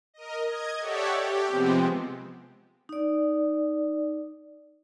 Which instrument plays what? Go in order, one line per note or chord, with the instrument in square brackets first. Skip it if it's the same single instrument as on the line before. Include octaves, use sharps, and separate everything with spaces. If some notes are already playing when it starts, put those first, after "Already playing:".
[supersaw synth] A#4 D#5
D#5 G#6
G4 A4 C#5 D5 E5 F#5
G4
C3 F3 G#3 B3 C4
[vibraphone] D#4 D5